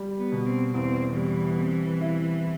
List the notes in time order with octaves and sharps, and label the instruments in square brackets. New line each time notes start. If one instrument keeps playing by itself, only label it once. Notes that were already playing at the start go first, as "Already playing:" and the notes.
Already playing: [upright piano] G3
[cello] B3
[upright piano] B2
[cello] C4
[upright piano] E2 [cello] C4
[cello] E3 [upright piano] G3
[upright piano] C4
E4